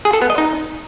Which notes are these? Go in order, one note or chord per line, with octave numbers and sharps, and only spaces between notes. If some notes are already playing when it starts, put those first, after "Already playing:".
G#4
A4
B3
D#5
D#4